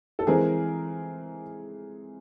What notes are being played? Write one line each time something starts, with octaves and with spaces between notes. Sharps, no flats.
A4
E3 G#3 C4 G#4 A#4